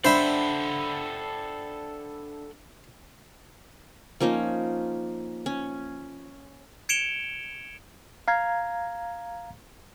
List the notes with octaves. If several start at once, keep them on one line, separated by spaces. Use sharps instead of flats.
D4 A4 C5 E5 F#5 G5 B5
F3 A#3 C#4 D#4
C#4
G#6 C#7 D7 E7 F7 G7
F5 A#5 G#6